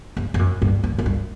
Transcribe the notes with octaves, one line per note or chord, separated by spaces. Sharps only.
G2
G2
F#2
G2
G2
F#2
G2